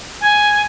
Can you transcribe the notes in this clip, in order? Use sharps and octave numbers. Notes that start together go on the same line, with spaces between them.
G#5